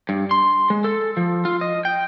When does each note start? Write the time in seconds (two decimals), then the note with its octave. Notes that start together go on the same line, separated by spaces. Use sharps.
0.09 G2
0.31 C6
0.70 G#3
0.84 A4
1.17 F3
1.45 F4
1.61 D#5
1.85 G5